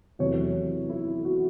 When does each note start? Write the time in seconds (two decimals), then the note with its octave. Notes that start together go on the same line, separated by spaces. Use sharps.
0.19 E2 C3 F#3 A3 C#5
0.89 E4
1.25 F#4